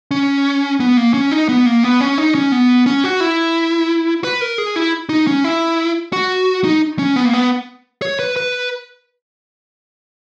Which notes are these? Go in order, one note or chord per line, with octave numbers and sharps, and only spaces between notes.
C#4
B3
A#3
C#4
D#4
B3
A#3
B3
C#4
D#4
C#4
B3
C#4
F#4
E4
B4
A#4
G#4
E4
D#4
C#4
E4
F#4
D#4
C#4
B3
A#3
B3
C#5
B4
B4